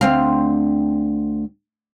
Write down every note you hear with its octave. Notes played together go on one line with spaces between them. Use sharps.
D2 C4 F5